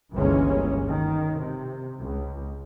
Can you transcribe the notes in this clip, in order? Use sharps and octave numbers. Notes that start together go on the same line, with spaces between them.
G1 C#2 E3 G#3 A#3 C#4
D#3
C3
C#2